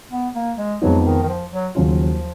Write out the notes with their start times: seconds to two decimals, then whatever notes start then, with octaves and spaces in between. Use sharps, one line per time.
0.11 B3
0.35 A#3
0.58 G#3
0.81 F2 F3 F#3 G#3 B3 D#4
1.05 D#3
1.23 D#3
1.29 F3
1.52 F#3
1.75 D#2 C#3 F3 F#3 C#4 F4